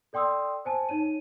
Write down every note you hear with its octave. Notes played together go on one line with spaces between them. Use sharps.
A4 D5 G5 C6 D#6 E6
C5 G#5 A5
D#4 C#5 D#7